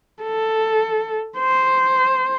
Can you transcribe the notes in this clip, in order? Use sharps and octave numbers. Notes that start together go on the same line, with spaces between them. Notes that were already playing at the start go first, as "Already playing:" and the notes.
A4
C5